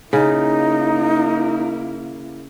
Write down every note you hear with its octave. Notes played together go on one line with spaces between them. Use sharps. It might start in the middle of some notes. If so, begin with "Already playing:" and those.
C#3 A#3 D#4 E4